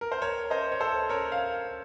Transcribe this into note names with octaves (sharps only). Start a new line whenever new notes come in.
A#4
C5
A#4 C#5
C5 D#5
C#5
A4 C5
A#4 C#5
F5